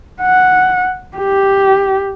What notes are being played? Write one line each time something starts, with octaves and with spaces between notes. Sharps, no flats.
F#5
G4